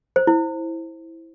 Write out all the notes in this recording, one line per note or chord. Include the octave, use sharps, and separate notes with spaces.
C5
E4